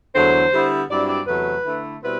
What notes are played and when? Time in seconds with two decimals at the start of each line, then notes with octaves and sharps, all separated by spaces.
0.14 E2 D3 F#3 A3 C5
0.52 D3 G3 B3 E4
0.90 G2 F#3 C4 E4 D5
1.08 D5
1.27 E2 C3 F#3 A3 B4
1.65 D3 A3 E4
2.03 B2 G3 C4 E4 B4